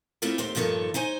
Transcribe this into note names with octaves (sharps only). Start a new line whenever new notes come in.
A3 A#3 C4 C#4 E4 F4
D#2 C4 G4 C5
G2 A#2 D#3 F3 A4 C#5
D#4 C5 C#5 G#5